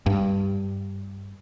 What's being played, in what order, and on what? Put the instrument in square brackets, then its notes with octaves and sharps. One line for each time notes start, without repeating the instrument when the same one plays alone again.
[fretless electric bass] G2